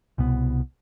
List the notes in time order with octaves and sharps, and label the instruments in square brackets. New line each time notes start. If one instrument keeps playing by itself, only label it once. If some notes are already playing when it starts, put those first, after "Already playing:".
[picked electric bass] C2 B2 B3